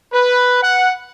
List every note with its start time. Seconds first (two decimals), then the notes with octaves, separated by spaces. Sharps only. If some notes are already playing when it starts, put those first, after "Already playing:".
0.12 B4
0.63 F#5